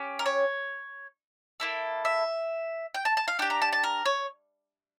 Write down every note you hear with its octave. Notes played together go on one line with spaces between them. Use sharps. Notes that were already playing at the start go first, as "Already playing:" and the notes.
Already playing: C#4 G4
A#4
C#5
A#3 E4 A4
E5
G5
A5
A5
F5
D4 G4 G5
A#5
A5
A5
A#4
C#5